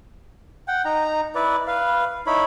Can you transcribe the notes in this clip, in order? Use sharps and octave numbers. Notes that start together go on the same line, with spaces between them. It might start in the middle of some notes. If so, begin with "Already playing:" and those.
F#5 G5
D#4 A#5
E4 B4 D5
B4 F5
D#4 E4 C#5 B5